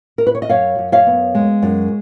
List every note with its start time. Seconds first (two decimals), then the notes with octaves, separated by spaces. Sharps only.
0.18 A#4
0.27 B4
0.35 C#5
0.42 D#5
0.49 F#2 C#5 F5
0.78 F#2
0.92 C#5 F5
1.07 B3
1.35 G#3
1.62 F#2